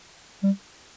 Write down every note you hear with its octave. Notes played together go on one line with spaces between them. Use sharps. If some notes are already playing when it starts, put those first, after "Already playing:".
G3